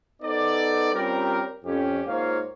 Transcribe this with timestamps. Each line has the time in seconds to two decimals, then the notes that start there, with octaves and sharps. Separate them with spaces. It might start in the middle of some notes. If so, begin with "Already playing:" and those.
0.22 B3 D#4 A4 C5 D5
0.93 G3 C4 C#4 F4 G4 A#4
1.65 F2 C#4 G4
2.06 G#2 A#3 F4 C5 C#5 F5